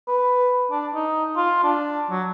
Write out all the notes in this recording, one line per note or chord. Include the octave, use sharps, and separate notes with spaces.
B4
D4
D#4
F4
D4
F#3